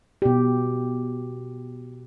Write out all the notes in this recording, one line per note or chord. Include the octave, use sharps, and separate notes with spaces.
B2 G4